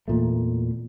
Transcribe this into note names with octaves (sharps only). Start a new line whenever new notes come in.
E2 A#2 A3